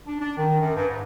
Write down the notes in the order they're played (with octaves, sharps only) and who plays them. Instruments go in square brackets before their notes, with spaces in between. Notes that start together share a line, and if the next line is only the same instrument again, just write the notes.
[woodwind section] D4
D4
D#3
F#2
G2
G#2